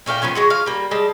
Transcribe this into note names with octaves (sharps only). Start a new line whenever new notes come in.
A#2 A3 F5 G5
F3 F#3 B3 C#4
F#3 G#3 F#4
F3 F5
G3 A#3
G3 G#3 A5